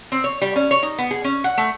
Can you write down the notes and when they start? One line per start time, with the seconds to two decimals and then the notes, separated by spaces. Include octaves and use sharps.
0.12 C4
0.24 C#5
0.42 G3
0.56 C#4
0.71 C#5
0.83 D#4
0.98 B3
1.11 G#4
1.24 C#4
1.44 F#5
1.58 A3